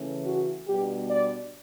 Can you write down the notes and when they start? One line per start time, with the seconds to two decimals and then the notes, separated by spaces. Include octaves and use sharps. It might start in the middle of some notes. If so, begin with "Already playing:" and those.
Already playing: C#3 E3 A3 C#4
0.26 F#4
0.68 B2 G3 B3 D4 G4
1.10 D5